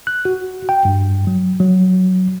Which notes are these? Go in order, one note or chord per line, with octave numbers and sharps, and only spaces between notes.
F#6
F#4
G5
G2
F#3
F#3